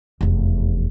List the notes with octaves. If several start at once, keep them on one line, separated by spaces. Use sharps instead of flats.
F1 E2